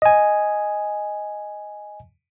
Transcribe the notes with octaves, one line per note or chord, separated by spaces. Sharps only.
D#5 G#5